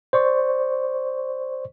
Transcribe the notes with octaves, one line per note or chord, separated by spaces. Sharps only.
C5 D5 C#6